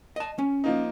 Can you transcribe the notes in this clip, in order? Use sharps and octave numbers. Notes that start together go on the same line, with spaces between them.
D#5 A5
C#4
F3 A#3 D#4